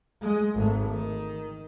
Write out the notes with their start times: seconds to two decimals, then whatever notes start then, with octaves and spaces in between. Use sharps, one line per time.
0.22 G#3
0.55 G#1 A3
0.91 D#3